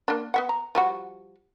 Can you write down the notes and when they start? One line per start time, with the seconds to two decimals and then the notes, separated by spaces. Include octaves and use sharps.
0.08 A#3 D4
0.34 B3 E5 F#5
0.49 A#5
0.75 F3 G3 F#4